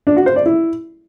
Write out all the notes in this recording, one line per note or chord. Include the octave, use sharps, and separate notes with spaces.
D4
F#4
C5
D5
E4